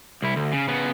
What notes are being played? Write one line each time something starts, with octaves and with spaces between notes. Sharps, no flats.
C2 E4
D2
C#3
C#3 B3